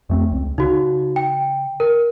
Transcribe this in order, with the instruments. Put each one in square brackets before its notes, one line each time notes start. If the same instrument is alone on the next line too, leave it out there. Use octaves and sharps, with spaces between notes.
[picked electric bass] F2 A3 C4
C#2
[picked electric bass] C#3 [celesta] D#4 F#4
[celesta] G5
A#4